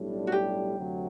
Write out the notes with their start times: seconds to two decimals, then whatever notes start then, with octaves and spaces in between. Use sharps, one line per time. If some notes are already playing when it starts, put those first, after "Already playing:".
Already playing: B1 A2 G3 D4
0.27 F#4
0.32 G4
0.77 D2 C3 F#3